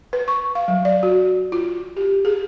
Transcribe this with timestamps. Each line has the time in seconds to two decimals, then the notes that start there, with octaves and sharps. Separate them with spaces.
0.13 B4
0.28 C#6
0.55 F5
0.68 F#3
0.85 D5
1.03 F#4
1.52 F4
1.97 G4
2.25 G#4